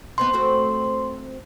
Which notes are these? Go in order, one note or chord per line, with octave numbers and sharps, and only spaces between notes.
B3 C4 D#4 C6
A3 C4 F#4